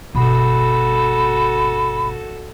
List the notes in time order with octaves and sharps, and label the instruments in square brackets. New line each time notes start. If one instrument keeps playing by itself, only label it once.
[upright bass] G1 B2 [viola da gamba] F#4 A4 [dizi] B5